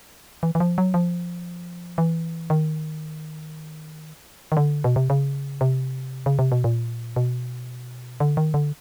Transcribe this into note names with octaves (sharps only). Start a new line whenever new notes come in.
E3
E3
F3
F#3
F3
E3
D#3
D#3
D3
B2
C3
C#3
C3
C#3
C3
B2
A#2
B2
D3
D#3
D3